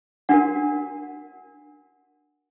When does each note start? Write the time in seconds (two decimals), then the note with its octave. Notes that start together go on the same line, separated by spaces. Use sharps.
0.29 D4 F#4 A#4 F#5